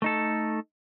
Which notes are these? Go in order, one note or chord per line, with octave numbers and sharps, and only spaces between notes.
A3 D#4 A4